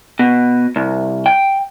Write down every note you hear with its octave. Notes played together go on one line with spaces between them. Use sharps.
B2
C2
G5